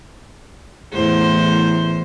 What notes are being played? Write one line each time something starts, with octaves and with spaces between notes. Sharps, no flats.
E2 A2 C5